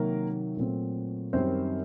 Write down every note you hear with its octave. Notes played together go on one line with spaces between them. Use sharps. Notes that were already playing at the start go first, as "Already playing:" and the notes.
Already playing: C3 D#3 F#3 A#3 A#4
A#2 F#3 A3 C4
F#2 D#3 G3 C4 C5